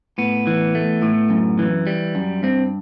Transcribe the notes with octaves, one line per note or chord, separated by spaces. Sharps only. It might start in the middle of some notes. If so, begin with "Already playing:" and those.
A2 B3
E3
A3
A2
F#2
E3
G3
F#2
G2 C4